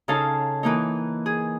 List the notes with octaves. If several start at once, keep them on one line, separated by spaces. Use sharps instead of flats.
C#3 D#4 A4 F5 A5
E3 A#3 D#4
G#4